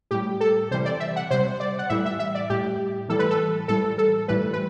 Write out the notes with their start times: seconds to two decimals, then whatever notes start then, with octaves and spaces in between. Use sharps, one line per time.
0.11 A2 G3 G4
0.40 A4
0.71 C3 E3 G3 C5
0.85 D5
1.00 E5
1.16 F#5
1.31 C3 G3 C5
1.60 D5
1.79 F#5
1.89 A2 E3 G3 E5
2.05 E5
2.19 E5
2.35 D5
2.50 A2 G3 G4
3.09 A2 E3 G3 A4
3.19 B4
3.30 A4
3.68 A2 E3 G3 A4
3.98 A4
4.28 A2 E3 G3 B4
4.53 B4